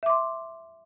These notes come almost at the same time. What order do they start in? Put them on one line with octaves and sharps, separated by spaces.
E5 D6 C6